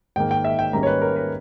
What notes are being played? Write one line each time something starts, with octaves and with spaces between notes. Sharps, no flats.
G#2 D#3 A#3 G5
G5
E5
G5
G#2 D#3 G3 A#3 C#4 A#5
C#5
B4
A#4
B4